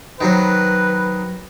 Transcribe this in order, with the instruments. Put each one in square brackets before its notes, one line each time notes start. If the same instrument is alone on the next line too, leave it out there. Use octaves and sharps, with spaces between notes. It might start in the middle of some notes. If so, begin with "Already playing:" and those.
[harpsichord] D#3 F#3 C5 [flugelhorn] B4